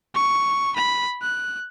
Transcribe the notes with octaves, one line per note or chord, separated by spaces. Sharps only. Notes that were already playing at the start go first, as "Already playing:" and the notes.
C#6
B5
F#6